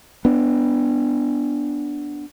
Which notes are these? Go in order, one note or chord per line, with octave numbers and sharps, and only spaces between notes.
B3 D4